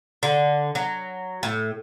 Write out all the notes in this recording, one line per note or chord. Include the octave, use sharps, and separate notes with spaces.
D3
F#3
A2